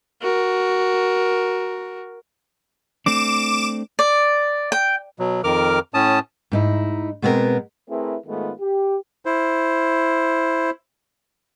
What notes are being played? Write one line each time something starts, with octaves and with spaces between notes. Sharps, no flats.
F#4 A#4
A3 C4 D4 D6 E7
D5
G5
B2 F#3
F2 D#3 A#4 D6 F6
A2 C#4 A5 D#6
G#2 D#4 E4
B2 G#3 B3 C4 E4 A#4
A3 C4 E4 G#4 A#4 B4
G#2 D#3 G#3 A3 B3 F4
G4
E4 C5